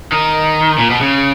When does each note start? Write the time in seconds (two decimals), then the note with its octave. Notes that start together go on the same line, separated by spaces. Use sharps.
0.12 D#3
0.78 A#2
0.90 B2
1.01 C#3